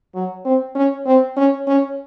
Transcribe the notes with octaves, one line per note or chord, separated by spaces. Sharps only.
F#3
C4
C#4
C4
C#4
C#4